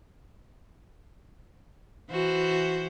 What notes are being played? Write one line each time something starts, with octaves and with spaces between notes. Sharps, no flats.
E3 F#4 C5